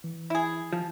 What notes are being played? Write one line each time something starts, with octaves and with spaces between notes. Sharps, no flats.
E3
E4 G#4
F3